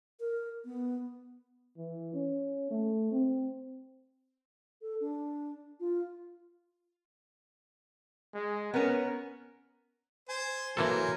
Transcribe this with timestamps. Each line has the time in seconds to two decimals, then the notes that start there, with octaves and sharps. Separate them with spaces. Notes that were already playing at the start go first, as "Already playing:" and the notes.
0.20 A#4
0.65 B3
1.78 E3
2.14 C#4
2.71 A3
3.12 C4
4.82 A4
5.01 D4
5.80 F4
8.34 G#3
8.74 B3 C#4 A#4
10.29 C5 G#5
10.77 E3 F#3 A#3 A4 A#4 C5 G#5